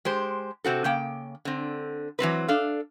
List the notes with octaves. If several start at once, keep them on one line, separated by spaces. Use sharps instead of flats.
G#3 G4 C5
C3 C4 F#4 A4
C#3 A#3 G5
D3 C4
E3 F#3 C4 B4
D4 A4 F5